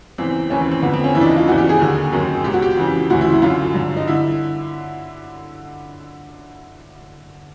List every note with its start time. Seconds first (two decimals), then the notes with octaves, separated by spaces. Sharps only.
0.18 E2 C#3 E3 C4
0.50 D#2 C#3 E3 C#4
0.61 C4
0.71 C4
0.82 F2 D3 B3
0.94 C4
1.04 C#4
1.15 D#2 C#3 E3 E4
1.21 D4
1.26 D#4
1.36 F4
1.48 E2 C#3 E3 F#4
1.58 G4
1.69 G#4
1.80 D#2 D3
2.13 F#2 D#3
2.44 C#2 B2 G4
2.53 F#4
2.62 G4
2.77 F2 C#3 E3
3.10 D2 C#3 E3 F#4
3.21 E4
3.31 E4
3.42 F#2 D3 F4
3.74 G2 D3
3.97 D#4
4.08 D3 E4